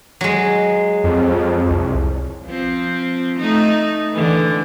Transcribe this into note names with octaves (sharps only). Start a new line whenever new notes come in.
F#3 G#3
F2
C2
F3 C4
A3 D#4
D3 E3